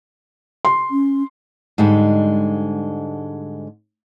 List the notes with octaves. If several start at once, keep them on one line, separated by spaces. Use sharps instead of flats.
C6
C#4
G#2 D3 G3 G#3